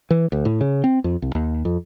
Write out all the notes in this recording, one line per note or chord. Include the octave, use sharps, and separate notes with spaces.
E3
D2
A2
C#3
C4
F2
C2
D#2
F2